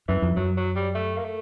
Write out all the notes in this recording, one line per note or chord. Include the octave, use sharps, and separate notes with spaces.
F#2 E3
F2
F#2 F#3
F#3
G3
A3
A#3
A3